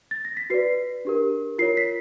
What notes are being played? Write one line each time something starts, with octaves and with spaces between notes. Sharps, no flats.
A6
A#6
B6
F#4 B4 D5 C7
D4 G4 A#4
F4 A#4 C#5 C7
B6